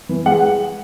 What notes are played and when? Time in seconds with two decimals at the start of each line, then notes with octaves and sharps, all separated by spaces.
0.09 E3
0.26 G#3 F#5